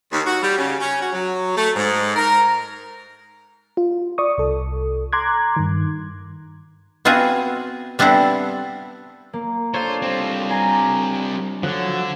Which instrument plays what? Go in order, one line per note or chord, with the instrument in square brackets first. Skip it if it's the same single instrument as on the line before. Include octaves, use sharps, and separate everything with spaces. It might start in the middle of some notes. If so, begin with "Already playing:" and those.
[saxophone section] D#2
F#4
G3
C#3
C#4
F#4
F#3
A3
G#2
A#4
[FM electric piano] F4
D5 C#6 D#6
C2 A4
A#5 C6 D6 F#6 G#6
G2 D#3
[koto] B3 C4 F4 F#4 G#4 G#5
G3 B3 C4 D4 E4 A4
[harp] A#3
[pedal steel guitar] D4 F4 C#5 [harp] A4 [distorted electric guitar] C5
[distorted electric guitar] G3 C4
[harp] G#5 A#5 C7
[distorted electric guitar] D3 [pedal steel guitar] F3 F#3 C#5 [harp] F#6